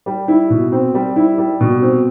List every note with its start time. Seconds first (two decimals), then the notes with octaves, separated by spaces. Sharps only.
0.06 G3
0.28 E4
0.50 B2
0.72 C4
0.94 G3
1.16 E4
1.38 G3
1.60 B2
1.82 C4